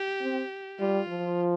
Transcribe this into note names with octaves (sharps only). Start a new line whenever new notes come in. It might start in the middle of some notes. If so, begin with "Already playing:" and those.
Already playing: G4
C4
G3 F4
F3